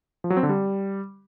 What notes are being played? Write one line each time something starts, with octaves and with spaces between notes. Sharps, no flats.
F3
F#3
C4
D3
G3